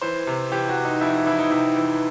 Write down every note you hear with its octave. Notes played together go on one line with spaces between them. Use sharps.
E3 C5
C3
E3 G4
F#4
C3
D#4
F2 E4
E4
E3 E4
D#4
C3 E4
E3